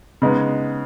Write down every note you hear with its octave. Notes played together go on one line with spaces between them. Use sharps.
C#3 G#3 B3 D#4